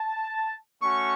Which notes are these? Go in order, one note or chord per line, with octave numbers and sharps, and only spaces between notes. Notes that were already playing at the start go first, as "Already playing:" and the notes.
Already playing: A5
A3 C#4 F#4 C#6